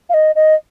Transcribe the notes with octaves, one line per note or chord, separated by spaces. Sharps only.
F5
D#5
D#5